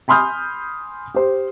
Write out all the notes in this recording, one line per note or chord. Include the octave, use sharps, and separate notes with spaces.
G#5 B5 C6 D#6 F6 G6
G4 C5